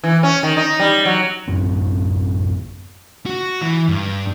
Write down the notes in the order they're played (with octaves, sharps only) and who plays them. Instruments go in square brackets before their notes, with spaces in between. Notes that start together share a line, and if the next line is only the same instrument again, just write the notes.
[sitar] E3
C#4
D#3
D#4
G3
F#3
[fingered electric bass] A1 F#2 C4
[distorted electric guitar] F#4
E3
G2